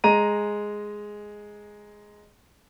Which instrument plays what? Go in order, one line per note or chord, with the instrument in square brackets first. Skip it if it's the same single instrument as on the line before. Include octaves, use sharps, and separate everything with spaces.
[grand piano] G#3 A#5 D#7